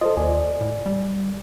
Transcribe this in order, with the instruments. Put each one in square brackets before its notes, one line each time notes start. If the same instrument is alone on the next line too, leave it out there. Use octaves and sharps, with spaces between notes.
[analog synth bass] F4 [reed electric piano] A4 C5 D#5
[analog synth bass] D#2 [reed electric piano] D5 G#5
[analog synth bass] A2
G3